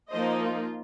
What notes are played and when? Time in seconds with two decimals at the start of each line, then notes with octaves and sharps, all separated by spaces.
0.11 F3 A#3 D#4 C5 D#5
0.41 F4